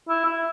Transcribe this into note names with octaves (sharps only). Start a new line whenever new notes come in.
E4
E4